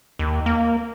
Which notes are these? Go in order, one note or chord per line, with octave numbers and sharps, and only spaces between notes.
D#2
A#3